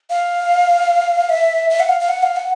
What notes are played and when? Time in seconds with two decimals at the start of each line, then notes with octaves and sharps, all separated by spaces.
0.10 F5
1.29 E5
1.70 E5
1.80 F#5
1.89 F5
2.00 F5
2.09 F#5
2.23 F5
2.36 F#5